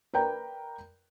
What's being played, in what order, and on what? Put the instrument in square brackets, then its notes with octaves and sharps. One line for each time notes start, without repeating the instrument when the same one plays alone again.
[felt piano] A#4 B4 D5 G5 A#5